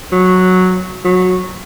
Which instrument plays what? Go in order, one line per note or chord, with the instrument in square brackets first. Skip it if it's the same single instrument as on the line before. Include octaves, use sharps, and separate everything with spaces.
[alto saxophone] F#3
F#3